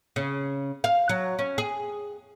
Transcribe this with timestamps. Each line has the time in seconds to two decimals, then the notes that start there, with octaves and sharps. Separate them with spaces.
0.16 C#3
0.84 F5
1.09 F#3
1.39 C#4
1.58 G#4